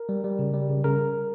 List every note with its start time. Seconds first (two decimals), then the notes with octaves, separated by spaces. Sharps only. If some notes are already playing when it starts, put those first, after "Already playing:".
Already playing: A#4
0.09 G3
0.24 G3
0.39 C#3
0.54 G3
0.69 C#3
0.84 C#3 A#4